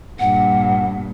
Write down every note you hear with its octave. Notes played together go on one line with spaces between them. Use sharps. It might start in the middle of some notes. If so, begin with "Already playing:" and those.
G2 A#2 F#5